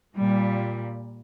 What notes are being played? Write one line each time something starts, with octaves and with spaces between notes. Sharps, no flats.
A#2 G3